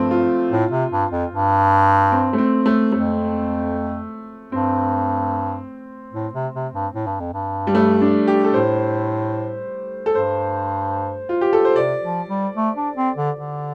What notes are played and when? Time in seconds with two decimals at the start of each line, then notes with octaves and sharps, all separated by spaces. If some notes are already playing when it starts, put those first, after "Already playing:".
Already playing: G2 F3 A3 C4
0.11 F4
0.51 A2
0.71 C3
0.91 G2
1.11 F2
1.32 G2
2.12 C4
2.33 A3
2.38 C4
2.66 A3
2.92 F2 A3
4.52 G2 C4
6.14 A2
6.33 C3
6.54 C3
6.73 G2
6.94 A2
7.07 G2
7.20 F2
7.33 G2
7.67 G3
7.75 A3
8.01 D4
8.27 G4
8.45 A4
8.54 A2 C5
10.06 A4
10.15 G2 C5
11.29 F4
11.41 G4
11.53 A4
11.65 C5
11.76 C3 D5
12.03 F3
12.29 G3
12.56 A3
12.76 D4
12.96 C4
13.16 D3
13.36 D3